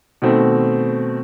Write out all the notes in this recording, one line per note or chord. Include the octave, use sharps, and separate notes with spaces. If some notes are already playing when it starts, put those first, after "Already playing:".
B2 D#3 A3 C4